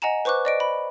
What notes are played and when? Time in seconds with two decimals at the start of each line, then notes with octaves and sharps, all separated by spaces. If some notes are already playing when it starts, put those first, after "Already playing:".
0.02 D#5 F#5 G#5 A#5 E7
0.25 B4 C5 C#6 D6 F#6
0.45 D5 D#5 D7
0.60 B5